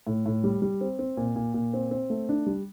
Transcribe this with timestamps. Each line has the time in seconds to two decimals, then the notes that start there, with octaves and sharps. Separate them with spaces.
0.07 A2
0.26 A2
0.44 G3
0.62 G3
0.81 C4
0.99 C4
1.17 A#2
1.36 A#2
1.54 A#2
1.74 C4
1.91 C4
2.10 A3
2.29 D4
2.46 G3